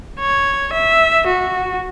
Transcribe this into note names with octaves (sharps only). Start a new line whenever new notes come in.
C#5
E5
F#4